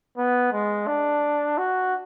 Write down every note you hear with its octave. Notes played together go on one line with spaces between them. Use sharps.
B3
G#3
D4
F#4